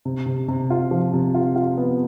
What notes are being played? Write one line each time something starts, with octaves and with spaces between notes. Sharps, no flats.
C3
C3
C3
F4
F3
C3
F4
F4
B3